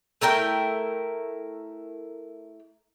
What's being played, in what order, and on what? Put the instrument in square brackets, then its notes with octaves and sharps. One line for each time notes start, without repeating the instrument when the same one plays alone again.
[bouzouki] A3 E4 A#4 G5